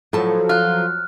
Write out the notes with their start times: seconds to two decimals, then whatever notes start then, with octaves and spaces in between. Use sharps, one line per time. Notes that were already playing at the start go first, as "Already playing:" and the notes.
0.13 A2 F3 F#3 A4 A5
0.49 F4 F6 F#6